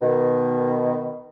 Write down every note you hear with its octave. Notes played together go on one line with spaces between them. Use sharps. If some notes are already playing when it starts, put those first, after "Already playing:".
B2 D#3